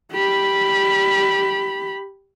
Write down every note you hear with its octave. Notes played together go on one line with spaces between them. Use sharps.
G4 B5